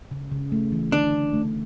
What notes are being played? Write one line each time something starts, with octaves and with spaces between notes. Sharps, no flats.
C#3
C#3
A3
E3
D3 D4
D3
A3